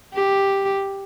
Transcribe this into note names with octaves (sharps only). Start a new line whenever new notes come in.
G4